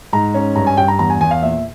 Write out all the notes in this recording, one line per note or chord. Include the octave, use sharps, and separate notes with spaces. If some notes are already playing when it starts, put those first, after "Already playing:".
G#2 A#5
C#4
G2 A#5
G#5
G2 G5
A#5
E2 A#5
G#5
E2 G#5
F5
A#2 E5